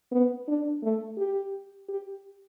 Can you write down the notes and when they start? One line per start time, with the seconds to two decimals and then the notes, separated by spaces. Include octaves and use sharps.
0.12 B3
0.48 D4
0.83 A3
1.18 G4
1.89 G4